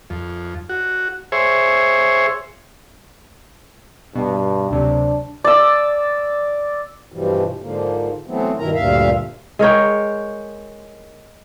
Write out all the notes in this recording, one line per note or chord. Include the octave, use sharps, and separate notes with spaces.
F2
F#4
G#4 C5 C#5 E5
G2 B2
D2 C3 F#3 D4
D5 E6
G2 B2 E3 F3 G3
G#2 D3 F3 A#3
A2 E3 F#3 A3 B3 C4
G2 B2 D#3 E4 A#4 A#5
D2 G2 A#2 E5 F5
G#3 A#4 C#5 G5